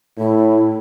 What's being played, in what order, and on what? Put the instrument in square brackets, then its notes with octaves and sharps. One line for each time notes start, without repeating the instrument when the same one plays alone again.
[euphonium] A2 [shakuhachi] E4